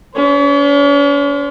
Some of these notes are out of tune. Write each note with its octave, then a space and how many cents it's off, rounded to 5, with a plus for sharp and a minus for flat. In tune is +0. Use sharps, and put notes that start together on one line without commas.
C#4 +45 C5 -10